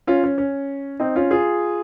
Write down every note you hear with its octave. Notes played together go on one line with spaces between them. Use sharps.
C#4 F4
C#4
C#4
C4 D#4
C#4 F4
F4 G#4